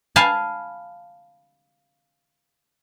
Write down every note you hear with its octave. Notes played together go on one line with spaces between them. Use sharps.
F5 G#5 A5 B5